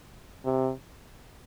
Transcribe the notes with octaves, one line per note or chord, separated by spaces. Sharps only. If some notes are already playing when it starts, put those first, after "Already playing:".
C3